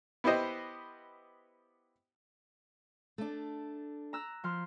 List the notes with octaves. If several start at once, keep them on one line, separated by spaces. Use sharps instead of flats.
B3 E4 G4 C5 D#5
A3 D4
A#5 E6 F#6
F3 C6 F6